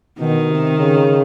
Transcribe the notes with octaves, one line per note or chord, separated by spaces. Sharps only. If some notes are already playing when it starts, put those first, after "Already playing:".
B2 D#3
C3
C#3